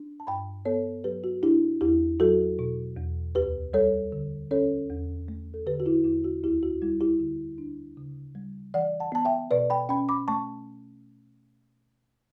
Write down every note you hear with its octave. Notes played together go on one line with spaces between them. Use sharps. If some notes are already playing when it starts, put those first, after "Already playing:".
Already playing: D4
A5
G2 G5 B5
B3 A4 C#5
F#3 G4 B4
F#4
D4 E4 G4
E2 E4 G4
F#3 F#4 A4
B2
E2
D2 G4 B4
G3 A4 C#5
D3
C#4 A4 C#5
E2
A3
A4
D3 G4 B4
F#4
E4 G4
E2 E4
F#4
D2 E4 G4
F#4
G3 E4
E4 G4
D3
D4
C#3
G3
E3 D5 F#5
F#5 A5
B3 A5
E5 G5
B2 B4 D5
G5 B5
C#4 G5 B5
B5 D6
A3 A5 C#6